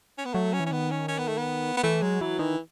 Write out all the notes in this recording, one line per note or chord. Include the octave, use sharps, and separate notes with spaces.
C#4
B3
F#3 A3
C#4
E3
C#4
D#3 B3
C#4
C#4
B3
A3
B3
B3
E3 A3
F#3 G#3
E3 F#3
D#3 E3